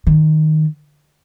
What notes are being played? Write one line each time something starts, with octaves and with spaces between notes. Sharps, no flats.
D#3